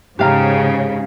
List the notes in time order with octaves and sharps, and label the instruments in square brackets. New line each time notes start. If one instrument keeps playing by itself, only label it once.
[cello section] G#2 C#3 [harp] G4 F5 A#5